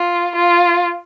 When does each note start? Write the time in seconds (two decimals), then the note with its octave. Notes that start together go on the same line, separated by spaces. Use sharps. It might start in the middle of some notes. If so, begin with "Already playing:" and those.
Already playing: F4
0.35 F4